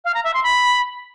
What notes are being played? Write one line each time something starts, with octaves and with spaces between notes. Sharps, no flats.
F5
A#5
E5
C6
B5